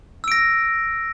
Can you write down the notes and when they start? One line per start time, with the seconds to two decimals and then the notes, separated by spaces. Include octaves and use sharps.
0.24 E6
0.28 D7
0.32 A#6